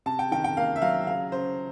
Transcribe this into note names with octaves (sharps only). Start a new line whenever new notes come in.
C3 A5
G5
D#3 G5
G5
A#3 F5
E5
F#3 F5
C#3 F5
C#3 C5